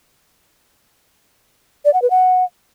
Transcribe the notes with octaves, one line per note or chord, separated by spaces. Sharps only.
D5
F#5
B4
F#5